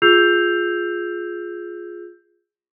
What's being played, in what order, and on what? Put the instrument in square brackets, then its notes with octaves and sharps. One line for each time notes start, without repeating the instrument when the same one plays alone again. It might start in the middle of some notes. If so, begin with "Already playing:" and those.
[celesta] F4 G#4 E6 G6 C7 F7